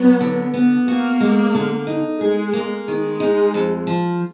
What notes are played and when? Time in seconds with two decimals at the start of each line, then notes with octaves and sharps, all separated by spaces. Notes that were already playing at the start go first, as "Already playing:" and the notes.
Already playing: F#3 B3
0.21 D3
0.54 B3
0.88 A#3 F#4
1.21 G#3
1.55 D3
1.87 D#4
2.20 G#3 G#4
2.53 A#3
2.87 D#3 G#3
3.20 D#4
3.54 F2
3.87 F3